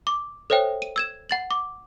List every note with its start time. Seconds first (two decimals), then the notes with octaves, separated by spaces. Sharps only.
0.07 D6
0.50 A4 C5 C#5 E5 G5
0.82 D#7
0.96 E6 G#6 E7
1.29 F#5 A6 F#7
1.51 D6